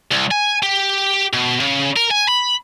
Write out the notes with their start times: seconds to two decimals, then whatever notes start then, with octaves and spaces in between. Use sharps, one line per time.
0.11 C2
0.31 G#5
0.63 G4
1.33 B2
1.60 C#3
1.96 A#4
2.11 G#5
2.28 B5